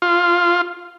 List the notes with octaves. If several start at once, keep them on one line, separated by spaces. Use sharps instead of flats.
F4